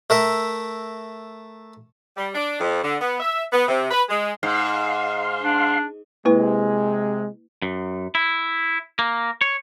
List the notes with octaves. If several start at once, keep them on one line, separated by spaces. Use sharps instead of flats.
A3 A#4 E5
G3
D4
F2
D3
B3
E5
B3
C3
B4
G#3
G#2 F5 C6
D4
C3 G#3 A#3 E4 B4
F#2
E4
A#3
C#5